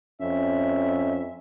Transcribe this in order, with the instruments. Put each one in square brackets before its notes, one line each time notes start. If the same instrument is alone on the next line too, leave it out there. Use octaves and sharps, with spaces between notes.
[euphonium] F2 [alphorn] C#4 [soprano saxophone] E5